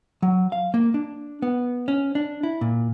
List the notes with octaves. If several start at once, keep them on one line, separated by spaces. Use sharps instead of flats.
F#3
F5
A#3
D4
B3
C#4
D4
E4
A#2